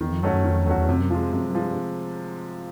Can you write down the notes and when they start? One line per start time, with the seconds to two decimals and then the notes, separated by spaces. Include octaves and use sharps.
0.01 E2 D#3
0.12 F2
0.23 F#2 F#3 A3 C#4 F#4
0.33 F#2
0.44 F2 D#3
0.66 E2 F#3 A3 C#4 F#4
0.78 E2
0.88 F2 C3
1.00 F#2
1.10 F2 F3 G#3
1.33 F#2 C3
1.54 G2 F3 G#3